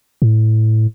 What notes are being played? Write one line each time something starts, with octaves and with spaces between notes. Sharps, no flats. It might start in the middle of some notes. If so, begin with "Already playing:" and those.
A2